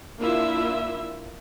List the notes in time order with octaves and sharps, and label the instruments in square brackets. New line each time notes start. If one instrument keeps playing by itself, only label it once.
[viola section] A#3 D4 E4 F4 E5